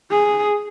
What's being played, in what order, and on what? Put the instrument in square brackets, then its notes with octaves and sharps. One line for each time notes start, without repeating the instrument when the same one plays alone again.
[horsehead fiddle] G#4